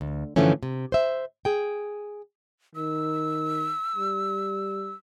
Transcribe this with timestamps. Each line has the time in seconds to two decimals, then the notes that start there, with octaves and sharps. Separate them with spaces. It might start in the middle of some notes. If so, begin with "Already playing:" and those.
0.01 D2
0.36 G2 D3 E3 F3 A3 C#4
0.63 C3
0.92 C5 E5
1.45 G#4 G5
2.75 D#3 E6
3.96 G3